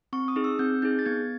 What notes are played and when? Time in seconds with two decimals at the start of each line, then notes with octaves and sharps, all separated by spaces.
0.13 C4 C#6
0.28 D#6
0.36 D#4 G#4
0.44 E6
0.59 C4 G6
0.82 D#4 G#4 G6
0.99 A6
1.06 B3 G#6